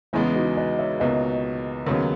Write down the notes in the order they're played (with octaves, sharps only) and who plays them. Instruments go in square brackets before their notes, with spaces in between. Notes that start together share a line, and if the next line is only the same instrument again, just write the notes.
[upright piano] E2 C#3 G#3 B3 [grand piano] C#4 E4
[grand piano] D#4 F#4
B4 D#5
C#5 E5
[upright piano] C#2 B2 A#3 [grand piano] B4 D#5
[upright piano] D#2 C#3 F#3 B3 [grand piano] A#4 C#5